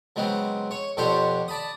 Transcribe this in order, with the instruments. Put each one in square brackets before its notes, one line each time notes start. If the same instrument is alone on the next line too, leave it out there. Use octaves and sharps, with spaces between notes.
[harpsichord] C#3 F#3 G#3 B3 C4
C#5
F2 B2 D4 G4 C5 C#5
D5 A5 B5 D#6